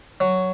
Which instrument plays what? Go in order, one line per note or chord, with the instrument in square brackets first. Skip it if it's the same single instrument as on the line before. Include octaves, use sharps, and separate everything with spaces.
[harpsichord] F#3